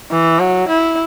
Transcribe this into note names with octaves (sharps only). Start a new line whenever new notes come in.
E3
F#3
E4